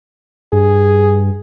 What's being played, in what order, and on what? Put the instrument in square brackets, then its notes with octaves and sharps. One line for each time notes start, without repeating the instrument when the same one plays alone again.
[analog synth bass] G2 [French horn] G#4